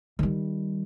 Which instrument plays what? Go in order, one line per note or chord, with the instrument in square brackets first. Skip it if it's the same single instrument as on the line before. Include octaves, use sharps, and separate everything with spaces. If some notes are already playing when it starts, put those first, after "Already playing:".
[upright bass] D#3 G3